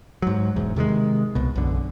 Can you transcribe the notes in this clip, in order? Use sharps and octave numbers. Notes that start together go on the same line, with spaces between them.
G#2 F#3
E1 E2 G#2
C3 D#3 G3 G#3
C2 B2
B1 F#2 D3